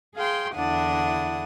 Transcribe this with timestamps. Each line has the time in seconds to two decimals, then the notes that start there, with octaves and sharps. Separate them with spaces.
0.16 G#4 F5 G5 C6
0.55 E2 D3 D4 E4 F#5 D#6